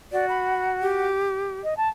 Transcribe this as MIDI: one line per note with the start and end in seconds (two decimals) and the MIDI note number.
0.12 1.08 66
0.12 0.26 74
0.29 0.71 83
0.82 1.61 67
1.63 1.74 75
1.77 1.88 81